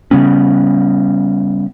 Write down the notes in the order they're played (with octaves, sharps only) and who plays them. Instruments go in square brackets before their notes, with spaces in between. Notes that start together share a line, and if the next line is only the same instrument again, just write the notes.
[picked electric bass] C#3 G3 B3 C#4